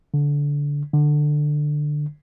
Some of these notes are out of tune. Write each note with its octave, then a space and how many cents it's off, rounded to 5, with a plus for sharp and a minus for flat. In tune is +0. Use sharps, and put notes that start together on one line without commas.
D3 -20
D3 +15